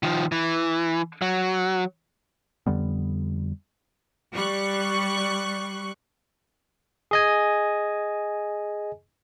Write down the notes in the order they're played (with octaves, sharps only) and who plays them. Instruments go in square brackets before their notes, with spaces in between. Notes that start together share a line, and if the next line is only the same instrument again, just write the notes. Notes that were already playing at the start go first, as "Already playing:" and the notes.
[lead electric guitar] D#3 F3
E3
F#3
[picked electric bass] F2 D3 G3 B3
[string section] G3 C#6 F#6
[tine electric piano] G#4 D#5 G#5